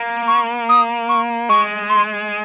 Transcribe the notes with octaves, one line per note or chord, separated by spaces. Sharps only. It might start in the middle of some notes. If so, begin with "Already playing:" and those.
Already playing: A#3
C#6
D#6
C#6
G#3 C#6
C6